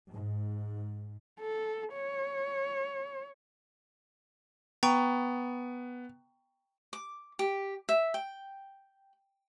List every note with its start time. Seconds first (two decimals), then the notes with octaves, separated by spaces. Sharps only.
0.11 G#2
1.40 A4
1.93 C#5
4.83 B3 G5 A#5 C#6
6.93 D6
7.39 G4
7.89 E5
8.14 G5